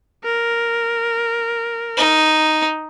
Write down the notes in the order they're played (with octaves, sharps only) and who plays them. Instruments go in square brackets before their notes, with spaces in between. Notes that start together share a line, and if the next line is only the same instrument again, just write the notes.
[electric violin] A#4
[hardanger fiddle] D#4